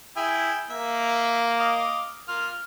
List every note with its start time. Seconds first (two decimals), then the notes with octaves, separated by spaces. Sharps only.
0.17 E4 G#4 G5 E6
0.70 A#3 E5
1.60 D#5 F5 D6
2.28 A#3 F4 F6